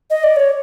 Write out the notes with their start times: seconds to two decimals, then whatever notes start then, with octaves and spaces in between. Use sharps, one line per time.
0.10 D#5
0.23 D5
0.36 C#5